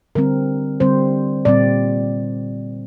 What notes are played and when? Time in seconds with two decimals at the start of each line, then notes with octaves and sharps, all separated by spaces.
0.15 D3 G3 C4 A#4
0.80 D3 G3 C4 C5
1.45 A#2 G3 C4 D5